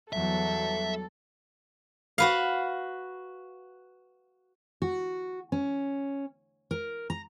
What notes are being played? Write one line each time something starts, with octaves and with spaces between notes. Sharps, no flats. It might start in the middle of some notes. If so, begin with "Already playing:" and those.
E2 F#3 G3 A4 E5
F#4 B4 F5
F#4
C#4
A#4
A#5